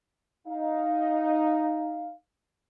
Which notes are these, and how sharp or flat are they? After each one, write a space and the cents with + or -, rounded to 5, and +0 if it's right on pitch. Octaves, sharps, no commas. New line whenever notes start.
D#4 +0 F5 +0